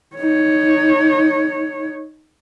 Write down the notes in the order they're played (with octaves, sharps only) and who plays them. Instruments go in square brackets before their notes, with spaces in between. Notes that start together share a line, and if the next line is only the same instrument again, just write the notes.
[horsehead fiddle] D#4 C#5